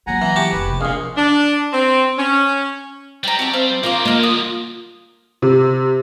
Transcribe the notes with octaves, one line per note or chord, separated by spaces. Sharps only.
F#3 A#3 F#5 G#5 A#5
E3
F#4 G4 A5
F1 D#3 B4
C3 F3
A#1 A#2 G#4 F5
D4
C4
C#4
G3 G5 A#5
C4 F#4 E5 A5
C4 C5 F5 E6
F3 A#3 F4 A#4 F5 C6 D6
D3 G#3 A#3 A#4 D#5
D#6
C3